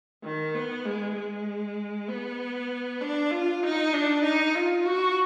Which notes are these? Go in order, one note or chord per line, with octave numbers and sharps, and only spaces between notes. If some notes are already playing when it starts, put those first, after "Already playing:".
D#3
B3
G#3
G#3
B3
D4
F4
D#4
D4
D#4
F4
F#4